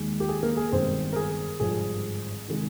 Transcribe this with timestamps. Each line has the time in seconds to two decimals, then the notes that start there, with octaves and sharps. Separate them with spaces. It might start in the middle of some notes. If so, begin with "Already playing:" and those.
Already playing: D#2 D#3 G#3
0.20 G4
0.29 G#4
0.43 A#3 A#4
0.57 G#4
0.72 G1 G2 D#3 G#3 C4 C5
1.13 A#4
1.16 G#4
1.60 G#1 G2 D3 F3 G#4
2.48 C3 D#3 G#3